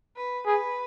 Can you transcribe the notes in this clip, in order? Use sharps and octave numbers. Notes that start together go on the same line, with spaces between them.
B4
G#4 B4